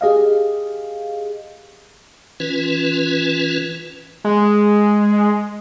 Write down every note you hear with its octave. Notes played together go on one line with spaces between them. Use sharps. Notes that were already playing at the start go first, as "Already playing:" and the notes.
G4 G#4 D#5 F5
E3 C#4 F4 B4
G#3